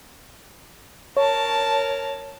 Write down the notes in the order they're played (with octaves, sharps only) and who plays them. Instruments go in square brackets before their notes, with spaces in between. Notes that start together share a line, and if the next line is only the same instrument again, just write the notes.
[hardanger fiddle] A#4 A5 [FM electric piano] C#5